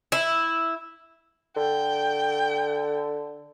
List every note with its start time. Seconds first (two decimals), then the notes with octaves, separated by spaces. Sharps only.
0.12 E4
1.56 D3 G5